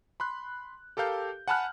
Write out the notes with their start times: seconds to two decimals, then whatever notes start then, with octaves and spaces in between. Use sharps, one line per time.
0.20 B5 C6 F#6
0.97 G4 A4 A#4 F5 G6
1.48 F#5 G#5 A5 B5 F6 F#6